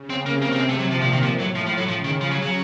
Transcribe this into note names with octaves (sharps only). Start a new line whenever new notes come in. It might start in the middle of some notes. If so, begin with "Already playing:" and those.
Already playing: C#3
C4
C3 A#3
A#3
A#3
C4
A3
F#3
A#2 F3
F3
D#3
A2 F3
F#3
F3
F3
F#3
C#3 F3
D#3
F3
F#3
F#3